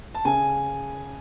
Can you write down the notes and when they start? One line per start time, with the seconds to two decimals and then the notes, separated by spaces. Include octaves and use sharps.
0.15 A5
0.25 C#3 G#5